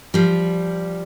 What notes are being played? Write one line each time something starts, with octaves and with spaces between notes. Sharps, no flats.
F3 G3